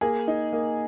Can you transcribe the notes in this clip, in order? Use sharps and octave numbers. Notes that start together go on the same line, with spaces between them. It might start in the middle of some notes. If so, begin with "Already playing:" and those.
A#3 G#4
D#4
A#3